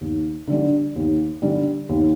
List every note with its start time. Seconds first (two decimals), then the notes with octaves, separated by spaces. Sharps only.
0.01 D#2
0.47 D3 G3 D4
0.96 D#2
1.42 D3 G3 D4
1.89 D#2